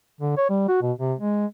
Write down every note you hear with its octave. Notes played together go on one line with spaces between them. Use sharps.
D3
C#5
G3
F#4
B2
C3
G#3